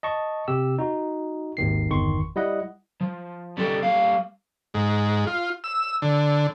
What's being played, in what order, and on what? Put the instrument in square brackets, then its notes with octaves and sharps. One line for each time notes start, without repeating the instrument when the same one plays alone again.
[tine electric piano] D#5 A5 C#6
C3 G4 E6
D#4 F#4
G#1 D#2 D#3 C7
G1 E2 D#3 C6 C#6
G3 E4 D#5 F#5
[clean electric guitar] F3
G3 C#4 A4 G5
G3 A#3 F5
[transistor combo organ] G#2
F4
E6
D3